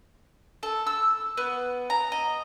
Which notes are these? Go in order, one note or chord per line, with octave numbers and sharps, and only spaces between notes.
A4
E6
B3
A#5
D#5